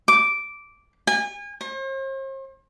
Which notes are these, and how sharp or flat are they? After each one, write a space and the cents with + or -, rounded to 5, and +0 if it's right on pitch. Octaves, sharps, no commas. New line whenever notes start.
D6 -10
G#5 -35
C5 +45